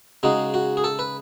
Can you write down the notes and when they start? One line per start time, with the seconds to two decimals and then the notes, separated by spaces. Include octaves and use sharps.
0.23 C#3 G#3 D#4 F#4
0.54 F#4
0.77 G#4
0.84 A4
0.99 B4